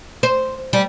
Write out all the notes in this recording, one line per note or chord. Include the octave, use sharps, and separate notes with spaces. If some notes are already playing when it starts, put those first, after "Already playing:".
C5
G3